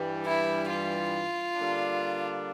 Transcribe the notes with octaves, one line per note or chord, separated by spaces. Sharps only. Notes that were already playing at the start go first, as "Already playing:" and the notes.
Already playing: G2 E3 G3
E4
F4
D3 G3 A#3 D4